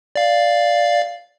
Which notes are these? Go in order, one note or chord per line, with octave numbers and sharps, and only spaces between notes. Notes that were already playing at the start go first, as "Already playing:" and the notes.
D5 F5